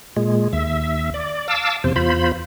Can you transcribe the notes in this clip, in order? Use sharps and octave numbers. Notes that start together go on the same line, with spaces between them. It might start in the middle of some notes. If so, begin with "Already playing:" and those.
A#2 G#3
D#2 E5
D5
F5 A5 D6 E6
E2 C3 C5
E2 F4 C5 B5